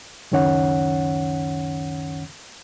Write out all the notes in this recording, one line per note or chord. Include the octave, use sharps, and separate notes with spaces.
C#2 F#2 D#3 C#4 C#5 F#5